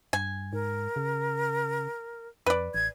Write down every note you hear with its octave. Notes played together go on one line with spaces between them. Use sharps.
G2 G#5
G#2 A#4
C#3
F2 B4 D5
A1 G#6